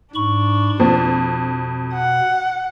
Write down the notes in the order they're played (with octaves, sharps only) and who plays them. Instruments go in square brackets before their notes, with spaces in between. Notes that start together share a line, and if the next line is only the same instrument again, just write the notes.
[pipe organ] G#2 B5 C#6 [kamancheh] D4
[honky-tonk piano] F2 [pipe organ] B2
[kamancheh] F#5